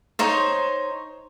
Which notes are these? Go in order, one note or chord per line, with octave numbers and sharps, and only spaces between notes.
D#4 C5 C#5